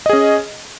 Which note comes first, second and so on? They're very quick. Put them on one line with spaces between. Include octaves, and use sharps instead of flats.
D#5 G#4 C#4